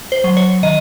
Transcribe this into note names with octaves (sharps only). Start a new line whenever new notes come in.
C5
F#3
C#5
D#3 D#5